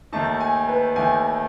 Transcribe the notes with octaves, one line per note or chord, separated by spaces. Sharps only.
D#2 D#3 A3 D#4 A5
G#5
B4
D#2 D#3 A3 D#4 G#5